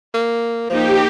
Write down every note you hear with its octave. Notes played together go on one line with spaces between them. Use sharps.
A#3
F3 A#3 D#4 G4